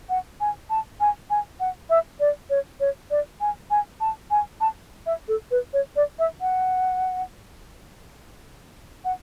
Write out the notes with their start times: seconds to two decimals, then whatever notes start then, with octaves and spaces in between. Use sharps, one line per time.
0.09 F#5
0.40 G#5
0.70 A5
1.00 G#5
1.30 G#5
1.60 F#5
1.90 E5
2.20 D5
2.50 C#5
2.80 C#5
3.11 D5
3.41 G#5
3.71 G#5
4.00 A5
4.31 G#5
4.61 A5
5.06 E5
5.28 A4
5.51 B4
5.73 C#5
5.96 D5
6.19 E5
6.41 F#5
9.05 F#5